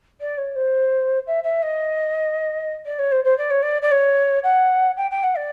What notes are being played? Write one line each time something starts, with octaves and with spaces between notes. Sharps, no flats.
D5
C#5
C5
E5
E5
D#5
D5
C#5
C5
C5
D5
C#5
D5
D5
C#5
F#5
G5
G5
F#5
D5